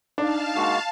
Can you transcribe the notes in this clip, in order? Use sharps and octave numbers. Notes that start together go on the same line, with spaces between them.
D4 D#4 F5 A5
G#3 A#3 F#4